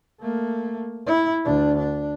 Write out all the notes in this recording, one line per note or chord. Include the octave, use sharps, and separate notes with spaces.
A3 A#3
E4
D2 D4
D4